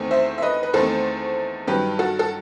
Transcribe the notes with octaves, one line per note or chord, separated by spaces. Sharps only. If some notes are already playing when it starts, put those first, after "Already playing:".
Already playing: E2 D#3 A3 C4
C5 E5
E5
B4 D#5
B4
E2 D#3 A3 C4 A4 C5
G2 D#3 F#3 G4 B4
F#4 A4
A4